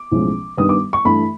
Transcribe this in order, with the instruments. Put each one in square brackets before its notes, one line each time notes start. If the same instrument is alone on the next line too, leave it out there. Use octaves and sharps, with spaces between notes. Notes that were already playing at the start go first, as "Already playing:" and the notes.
Already playing: [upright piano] D6
B1 A2 F3 G#3 C#4
G2 D#3 G3 B3 D#6
D6
C#6
G2 E3 A3 B5